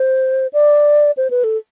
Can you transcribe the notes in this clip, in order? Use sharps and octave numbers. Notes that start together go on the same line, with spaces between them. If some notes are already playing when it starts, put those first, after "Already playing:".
Already playing: C5
D5
C5
B4
A4